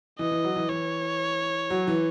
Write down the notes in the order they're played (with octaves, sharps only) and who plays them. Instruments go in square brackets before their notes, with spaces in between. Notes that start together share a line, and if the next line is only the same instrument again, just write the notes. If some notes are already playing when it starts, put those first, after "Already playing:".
[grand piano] E3 [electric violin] D#5
[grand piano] E3
F#3
E3
[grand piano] E3 [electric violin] C#5
[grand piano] F#3
E3